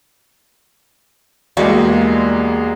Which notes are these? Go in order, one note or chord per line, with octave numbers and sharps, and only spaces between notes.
E2 G3 G#3 A#3 F#4 F5